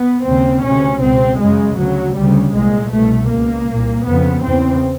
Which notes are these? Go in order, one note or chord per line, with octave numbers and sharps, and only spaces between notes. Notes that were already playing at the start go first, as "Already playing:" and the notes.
Already playing: B3
D#2 C#3 C4
D2 C3 C#4
C#2 B2 C4
F#2 C#3 G#3
D2 C#3 F#3
D2 C#3 G3
C2 A#2 G#3
C2 B2 A3
C#2 B2 A#3
C2 A#2
F2 C#3 B3
E2 C#3 C4